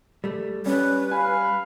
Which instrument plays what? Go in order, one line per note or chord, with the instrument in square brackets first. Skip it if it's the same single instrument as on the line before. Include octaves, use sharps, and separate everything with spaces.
[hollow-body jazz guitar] G3 A3
[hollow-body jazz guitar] G3 [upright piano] C#4 [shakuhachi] B4
[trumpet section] F5 B5 [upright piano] G#5